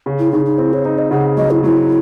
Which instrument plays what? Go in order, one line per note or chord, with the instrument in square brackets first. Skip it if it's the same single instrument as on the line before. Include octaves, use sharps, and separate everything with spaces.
[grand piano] C#3
[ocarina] E4
[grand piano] C#3 [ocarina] D#4
[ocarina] D#4
[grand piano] C4 [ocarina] E4
[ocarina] C#5
[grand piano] D#4 [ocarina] C5
[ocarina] D#5
[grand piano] C#3 [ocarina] F#5
[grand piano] F#3 [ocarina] D#5
[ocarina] E4
[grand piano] F#3 [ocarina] E4